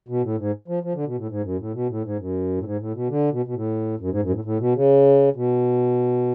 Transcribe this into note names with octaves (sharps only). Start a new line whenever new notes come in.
B2
A2
G#2
F3
F3
D3
B2
A2
G#2
F#2
A2
B2
A2
G#2
F#2
A2
G#2
A2
B2
D3
B2
B2
A2
F#2
G#2
F#2
G#2
A2
A2
B2
C#3
B2